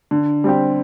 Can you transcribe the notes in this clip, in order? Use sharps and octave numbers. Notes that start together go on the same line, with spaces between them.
D3
G3 C4 G4